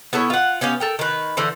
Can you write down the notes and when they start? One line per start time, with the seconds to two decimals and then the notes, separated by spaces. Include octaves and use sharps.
0.13 B3 E4 A4 C#5
0.30 F4 F#5
0.61 B3 C#4 G4 F5
0.80 A4 A#4 G5
0.99 D#3 B4
1.37 D3 E3 C5